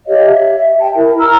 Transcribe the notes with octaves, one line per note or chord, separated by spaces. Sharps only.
G4 C#5 D#5 F5
E5
G5 A5
E4 A#4
A#5 E6 F6